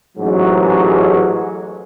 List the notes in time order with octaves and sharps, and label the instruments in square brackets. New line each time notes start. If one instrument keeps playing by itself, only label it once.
[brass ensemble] A1 G#2 F#3